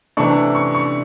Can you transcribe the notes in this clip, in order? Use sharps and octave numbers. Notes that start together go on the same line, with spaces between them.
C3 E3 A3 D4 C#6
C#6
C#6